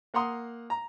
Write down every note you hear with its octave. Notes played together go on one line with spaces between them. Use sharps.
A#3 F#5 A#5 C6 D#6
A#5